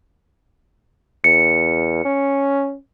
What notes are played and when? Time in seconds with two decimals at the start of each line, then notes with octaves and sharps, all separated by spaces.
1.24 E2 C#7
2.05 C#4